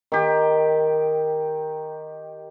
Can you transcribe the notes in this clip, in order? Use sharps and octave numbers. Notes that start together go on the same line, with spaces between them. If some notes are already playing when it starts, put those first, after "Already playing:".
D#3 G4